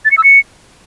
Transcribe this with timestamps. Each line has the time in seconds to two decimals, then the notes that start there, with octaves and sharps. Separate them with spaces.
0.05 A6
0.11 C#7
0.18 E6
0.24 C#7